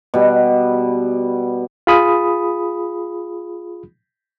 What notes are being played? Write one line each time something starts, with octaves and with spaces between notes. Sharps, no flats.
B2 G3
F4 G#4 B5 D#6